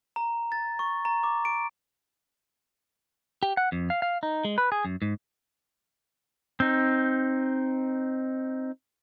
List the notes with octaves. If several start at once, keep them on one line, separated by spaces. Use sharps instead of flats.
A#5
A6
C#6
A#5
D6
D7
G4
F#5
F2
F5
F5
D#4
G#3
B4
G#4
F#2
G#2
C4 D#4